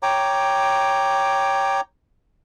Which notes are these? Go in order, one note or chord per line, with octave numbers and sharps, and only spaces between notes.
C#5 G5 A#5 D6